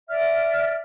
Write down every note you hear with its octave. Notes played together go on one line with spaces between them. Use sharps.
D5 E5 F6